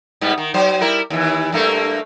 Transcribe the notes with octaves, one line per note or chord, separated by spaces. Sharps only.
G#2 G3 B3
D#3
F#3 C5
G3 E4 A#4
D#2 E3
G2 A3 A#3